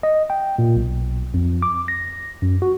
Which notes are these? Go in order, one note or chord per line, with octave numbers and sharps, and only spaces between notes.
D#5
G5
A#2
B1
F2
D6
A#6
F#2
F#4